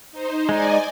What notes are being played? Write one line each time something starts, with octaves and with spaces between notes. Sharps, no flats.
D#4 C5
G#3 D#4 D5 D#5 G#5